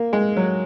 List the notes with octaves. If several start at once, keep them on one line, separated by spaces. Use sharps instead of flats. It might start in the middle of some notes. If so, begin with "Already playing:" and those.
Already playing: A#3
G#3
F#3